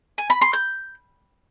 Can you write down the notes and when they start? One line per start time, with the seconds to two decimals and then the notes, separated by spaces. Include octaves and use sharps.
0.18 G#5
0.30 B5
0.41 C6
0.53 G6